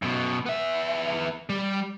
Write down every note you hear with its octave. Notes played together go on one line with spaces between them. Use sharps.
F#2 B2
B3 E5
G3